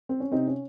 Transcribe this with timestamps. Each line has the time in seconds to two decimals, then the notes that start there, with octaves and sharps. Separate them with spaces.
0.09 C4
0.20 C#4
0.32 C3 C4 D#4
0.47 C#4